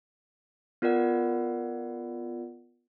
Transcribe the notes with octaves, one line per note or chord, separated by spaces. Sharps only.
B3 F4 A#4 D5 F#5